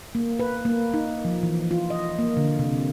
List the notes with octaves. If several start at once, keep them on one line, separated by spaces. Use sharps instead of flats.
A#3
B4
A#3
D#4
F3
E3
F4
D#5
A#3
D3
C3